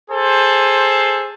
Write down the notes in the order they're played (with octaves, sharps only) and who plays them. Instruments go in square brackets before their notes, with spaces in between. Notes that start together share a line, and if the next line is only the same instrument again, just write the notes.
[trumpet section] G#4 A4 C5